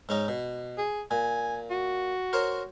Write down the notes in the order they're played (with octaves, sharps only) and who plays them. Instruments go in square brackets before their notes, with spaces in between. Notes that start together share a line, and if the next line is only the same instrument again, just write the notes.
[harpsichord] G#2 C#4 D#4
B2
[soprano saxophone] G#4
[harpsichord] A#2 [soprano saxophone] G#5
[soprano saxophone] F#4
[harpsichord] A#4 C5 C#5